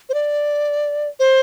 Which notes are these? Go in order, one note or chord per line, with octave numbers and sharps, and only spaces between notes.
C5
D5
C5